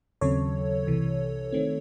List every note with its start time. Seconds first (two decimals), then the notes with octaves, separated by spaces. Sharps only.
0.21 D#2 C#3 F#3 C4 A4 C#5
0.86 C2 C3 E3
1.52 D#3 A3 C4